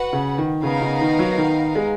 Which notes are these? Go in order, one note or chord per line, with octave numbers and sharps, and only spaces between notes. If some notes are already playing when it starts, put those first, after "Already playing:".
Already playing: F#4 B4 F#5
C#3
D#3
C#3 B3 D#4 A#4 F5
C#3
D#3
F#3
D#3
G#3